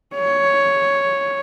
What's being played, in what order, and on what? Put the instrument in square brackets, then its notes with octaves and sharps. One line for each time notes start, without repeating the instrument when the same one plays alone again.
[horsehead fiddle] C#5